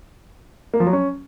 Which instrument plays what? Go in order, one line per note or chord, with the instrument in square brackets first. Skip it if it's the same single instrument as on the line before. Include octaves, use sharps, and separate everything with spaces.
[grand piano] A#3
F3
F#3
C#4